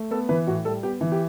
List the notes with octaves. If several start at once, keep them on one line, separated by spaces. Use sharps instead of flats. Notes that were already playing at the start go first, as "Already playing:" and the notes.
Already playing: A3
B3 A4
E3 B4
A2 F#4
G3 A4
B3 G4
E3
G4